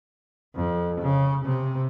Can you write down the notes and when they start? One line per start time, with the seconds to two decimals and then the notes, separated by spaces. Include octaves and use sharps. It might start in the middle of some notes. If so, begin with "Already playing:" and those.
0.55 F2
1.01 C#3
1.45 C3